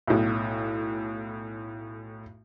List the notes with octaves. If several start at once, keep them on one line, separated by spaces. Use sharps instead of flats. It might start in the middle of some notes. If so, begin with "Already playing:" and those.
B1 A2